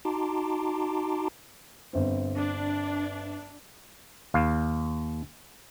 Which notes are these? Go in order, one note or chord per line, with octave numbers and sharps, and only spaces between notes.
D#4 F#4 A5 A#5 C6 D6
G1 C4
D4
D#2 F5